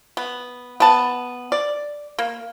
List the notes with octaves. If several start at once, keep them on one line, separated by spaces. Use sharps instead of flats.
B3
B3 A5
D5
A#3